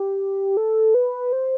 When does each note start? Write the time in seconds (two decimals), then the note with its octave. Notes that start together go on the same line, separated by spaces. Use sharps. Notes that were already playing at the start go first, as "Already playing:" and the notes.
Already playing: G4
0.57 A4
0.94 B4
1.32 C5